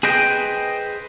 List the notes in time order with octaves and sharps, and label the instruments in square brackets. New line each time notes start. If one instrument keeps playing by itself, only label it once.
[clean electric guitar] G#4 B4 C5 D#5 G5